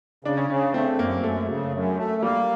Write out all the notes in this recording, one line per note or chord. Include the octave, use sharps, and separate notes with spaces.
C#3 D4
C#4
C#3 C#4
C#4
A3 C4
F#2 A#3
F#2 A3
C#3
F#2
A3
G3 A#3